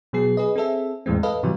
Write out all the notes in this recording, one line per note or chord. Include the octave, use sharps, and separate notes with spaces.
B2 F#3 B3 G#4 C7
G#4 B4 D#5
C4 G#4 A4 E5
E2 A2 E3 G#3 C4
A4 B4 D#5 F5
G#2 C3 E3 F#3 G3